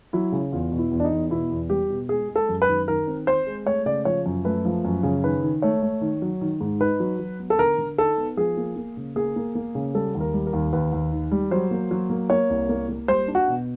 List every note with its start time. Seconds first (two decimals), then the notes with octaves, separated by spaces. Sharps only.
0.13 F#3 E4
0.32 C#3
0.52 E2 F4
0.72 B2
0.79 E4
0.91 E2
1.00 D4
1.05 D#4
1.11 E2
1.30 B2 E4
1.50 E2
1.70 G3 G4
1.90 B2
2.09 G#3 G#4
2.29 G#3
2.36 A4
2.49 F#2
2.62 B4
2.68 D#3
2.88 D#3 A#4
3.07 C4
3.27 C4 C5
3.47 G#3
3.66 A3 C#5
3.86 C#3 D5
4.05 F3 C#5
4.26 F#2
4.45 A3 B4
4.65 F3
4.85 F#2
5.03 C#3
5.23 D#3 B4
5.43 D#3
5.62 A3 C#5
5.82 A3
6.01 D#3
6.22 F#3
6.41 D#3
6.61 G#2
6.80 D#4 B4
7.00 F#3
7.19 F#3
7.39 B3
7.50 A4
7.59 D3 A#4
7.78 D3
7.97 D#4 A4
8.17 B3
8.37 F3 G#4
8.57 A#3
8.76 A#3
8.97 C#3
9.16 A#3 G#4
9.36 A#3
9.55 A#3
9.75 C#3
9.94 G3 A4
10.14 D#2
10.20 A#4
10.33 G3
10.47 A#4
10.53 D#2
10.73 D#2 B4
10.92 D#2
11.12 D#3
11.31 G3
11.51 F#3 C5
11.71 A#3
11.91 F#3
12.10 A#3
12.30 A#3 C#5
12.50 C2
12.69 A#3
12.89 A#3
13.08 G3 C5
13.28 D4
13.35 F#4
13.48 B2